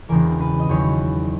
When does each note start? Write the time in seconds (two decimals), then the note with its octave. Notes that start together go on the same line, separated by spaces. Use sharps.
0.09 E1 E2 C#3 E3 A#4
0.40 B4
0.59 D#5
0.69 E2 D#3 F#3 C#5